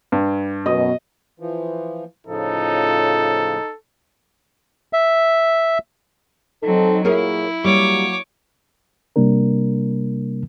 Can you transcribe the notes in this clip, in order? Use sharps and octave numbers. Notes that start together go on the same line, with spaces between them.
G2
F#2 B2 D#5
E3 F3
A2 C#3 F3 D#4 A4
E5
F#3 C4 D#4 A4
A#2 F#3 A#3 E4 G#4 A#4 C#5
F#3 G3 A#3 C#5 D6
C3 G3 A#3 D4 A#4